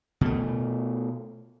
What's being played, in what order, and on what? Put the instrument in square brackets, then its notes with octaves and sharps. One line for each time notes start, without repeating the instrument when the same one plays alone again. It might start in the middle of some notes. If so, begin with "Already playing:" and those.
[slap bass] B2 A3